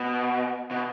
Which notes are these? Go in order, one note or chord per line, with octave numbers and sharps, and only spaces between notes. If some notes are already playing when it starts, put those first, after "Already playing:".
Already playing: B2
B2